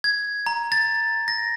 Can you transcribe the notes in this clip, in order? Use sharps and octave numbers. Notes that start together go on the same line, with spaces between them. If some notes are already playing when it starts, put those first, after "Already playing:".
G#6
A#5
A6
A#6